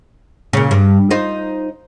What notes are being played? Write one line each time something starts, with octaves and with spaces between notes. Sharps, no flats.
A#2 C#3
G2
D#4 F4 C5